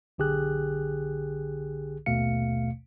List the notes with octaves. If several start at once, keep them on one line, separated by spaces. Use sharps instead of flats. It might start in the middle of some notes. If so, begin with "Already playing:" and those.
B1 D3 G4 G#4 F#6
A#1 D#2 B2 A3 F5 C#7